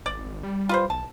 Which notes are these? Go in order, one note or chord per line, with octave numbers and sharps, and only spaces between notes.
G#1 D5
G3
F4 B4 C5
B1 A5